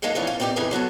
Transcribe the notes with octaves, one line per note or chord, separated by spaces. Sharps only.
F3 F#3 G#3 A#3 D#4 A4
E3 F3 G3 C#4 D#4
F4
C4 D#4 G4 C5 D5
F2 C#3 E3 D#4 G#4 G#5
F#3 B3 F#4 A4